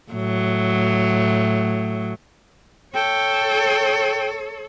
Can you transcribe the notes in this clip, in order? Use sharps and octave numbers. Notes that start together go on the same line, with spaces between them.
A2 F#3
A4 C#5 G5